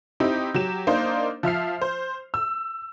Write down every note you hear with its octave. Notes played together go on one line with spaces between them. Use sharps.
C4 D#4 E4 G4
F#3 G4 E7
A#3 D4 D#4 C5
F3 E5 F6 C7
C5
E6